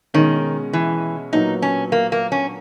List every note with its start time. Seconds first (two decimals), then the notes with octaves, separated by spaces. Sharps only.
0.14 B2 D#3 G#3 C#4
0.73 E3
1.33 A#2 F#3 B3 D#4 F#4 A#4
1.62 C#4
1.92 A#3
2.12 A#3
2.32 C#4